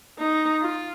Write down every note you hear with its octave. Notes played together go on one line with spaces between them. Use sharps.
D#4
F4